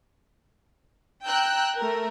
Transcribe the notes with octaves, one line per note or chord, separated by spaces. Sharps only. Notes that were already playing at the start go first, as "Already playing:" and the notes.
G5 A#5 E6 F#6 G6
A3 A#4